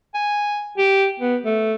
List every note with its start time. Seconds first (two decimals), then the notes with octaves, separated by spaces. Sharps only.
0.14 G#5
0.78 G4
1.20 B3
1.45 A3